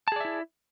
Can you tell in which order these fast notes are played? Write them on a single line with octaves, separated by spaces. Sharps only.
A5 G#4 D5 E5 E4